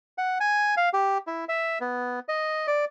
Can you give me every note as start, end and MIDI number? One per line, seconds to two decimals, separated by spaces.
0.18 0.38 78
0.40 0.75 80
0.77 0.89 77
0.93 1.18 67
1.27 1.45 64
1.49 1.78 76
1.81 2.19 59
2.29 2.67 75
2.67 2.85 74